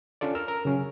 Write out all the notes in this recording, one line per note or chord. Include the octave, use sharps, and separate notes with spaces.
C#4 D4 F4 A4 D5
A#4 E6 F6
A#4
C#3 F#3 C#4